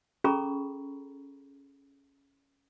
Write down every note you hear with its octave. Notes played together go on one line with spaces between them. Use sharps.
C#4 G#4 A4 A#5 B5 C#6